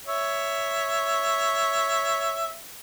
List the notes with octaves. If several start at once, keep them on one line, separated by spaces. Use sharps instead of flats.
C#5 E5